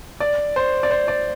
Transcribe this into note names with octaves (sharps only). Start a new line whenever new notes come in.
D5
C5
D5
C5
D5